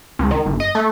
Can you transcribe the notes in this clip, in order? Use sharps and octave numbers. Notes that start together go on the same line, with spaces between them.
C#2
D#3
G1
D#5
A3